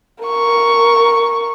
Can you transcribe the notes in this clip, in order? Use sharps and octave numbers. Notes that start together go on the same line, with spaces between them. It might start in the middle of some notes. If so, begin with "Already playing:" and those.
A#4 C#6